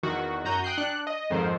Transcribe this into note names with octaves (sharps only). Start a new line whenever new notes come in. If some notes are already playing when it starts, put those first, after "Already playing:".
E2 D#3 F#4
F#2 F#4 A#5 G6 D#7
G5 D#6 F#6 G6 C7
D4 F#6 C#7
D#5
F2 G#2 D#3 C5